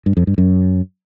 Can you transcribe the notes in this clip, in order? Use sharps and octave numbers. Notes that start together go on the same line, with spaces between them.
G2
F2
G2
F#2